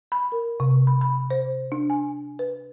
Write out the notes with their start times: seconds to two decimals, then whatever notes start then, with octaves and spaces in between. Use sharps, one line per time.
0.12 B5
0.32 A#4
0.60 C3
0.87 B5
1.01 B5
1.30 C5
1.72 D4
1.90 G#5
2.39 B4